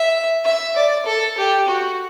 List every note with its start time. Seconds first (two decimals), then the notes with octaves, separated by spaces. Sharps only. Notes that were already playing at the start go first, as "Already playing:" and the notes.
Already playing: E5
0.44 E5
0.76 D5
1.06 A4
1.38 G4
1.68 F#4